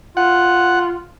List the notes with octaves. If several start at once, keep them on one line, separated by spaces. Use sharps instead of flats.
F4 F#5